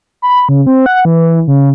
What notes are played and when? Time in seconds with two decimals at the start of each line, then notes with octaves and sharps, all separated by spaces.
0.22 B5
0.49 C#3
0.66 C4
0.86 F#5
1.05 E3
1.48 C#3